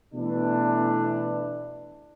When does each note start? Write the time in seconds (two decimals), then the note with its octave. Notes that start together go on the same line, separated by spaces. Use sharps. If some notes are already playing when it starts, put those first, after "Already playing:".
0.15 B2 E3 A3 D4